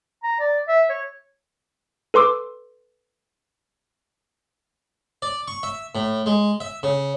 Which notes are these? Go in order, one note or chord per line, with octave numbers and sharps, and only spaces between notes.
A#5
D5
E5
C#5
A4 B4 C6 D6 E6
D5
C#6
E5
A2
G#3
E5
C#3